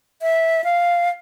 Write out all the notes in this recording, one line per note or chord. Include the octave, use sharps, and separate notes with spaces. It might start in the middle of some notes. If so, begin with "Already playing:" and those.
E5
F5